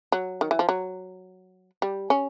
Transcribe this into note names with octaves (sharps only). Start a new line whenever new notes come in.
F#3
D#3
E3
F3
F#3
G3
C#4